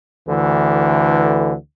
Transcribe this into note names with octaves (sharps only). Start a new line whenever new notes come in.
D2 D3 E3